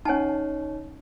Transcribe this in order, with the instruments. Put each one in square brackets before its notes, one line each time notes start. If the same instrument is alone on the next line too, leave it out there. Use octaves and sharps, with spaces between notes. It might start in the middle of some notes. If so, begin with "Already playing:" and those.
[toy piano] C#4 G#5 A5 [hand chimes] D#4 C#5